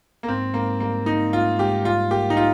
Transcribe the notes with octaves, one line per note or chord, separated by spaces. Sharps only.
A#3
G#2 C4
G#2 A#3
G3 A#3
A#3 D#4
G#2 F4
G#2 G4
G3 F4
A#3 G4
D#4
F4